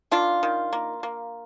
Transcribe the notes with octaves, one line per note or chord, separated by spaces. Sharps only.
D#3 D4 F4
D#3
A#3
A#3